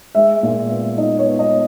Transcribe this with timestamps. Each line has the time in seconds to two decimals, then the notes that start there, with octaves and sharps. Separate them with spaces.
0.15 G#3 E5
0.43 A#2
0.69 B3
0.97 D#4 D#5
1.19 C#5
1.26 B3
1.39 D#5